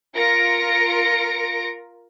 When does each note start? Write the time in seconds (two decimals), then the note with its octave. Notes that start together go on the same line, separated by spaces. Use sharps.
0.16 F4 A#4 A#6 C#7 D7